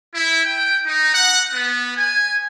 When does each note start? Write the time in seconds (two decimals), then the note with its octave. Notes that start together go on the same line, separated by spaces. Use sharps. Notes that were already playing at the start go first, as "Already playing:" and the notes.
0.14 E4
0.45 G5
0.85 D#4
1.15 F#5
1.54 B3
1.96 G#5